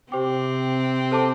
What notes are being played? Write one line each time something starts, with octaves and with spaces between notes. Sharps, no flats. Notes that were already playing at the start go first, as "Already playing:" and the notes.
C3 C4 G4 C5 G5 D6
A4 C5 A5 D6